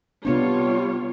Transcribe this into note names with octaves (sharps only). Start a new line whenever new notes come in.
C3 G3 B3 D4 F4 C#5